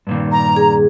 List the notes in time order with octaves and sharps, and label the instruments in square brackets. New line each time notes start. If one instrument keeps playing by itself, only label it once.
[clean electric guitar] G2 A#2 D#3
[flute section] A#5
[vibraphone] G#4